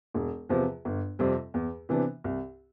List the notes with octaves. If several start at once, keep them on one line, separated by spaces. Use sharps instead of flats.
E1
E2 C3 F3 B3
G1
F2 C3 G3 C4
E2
C3 E3 B3 D4
C2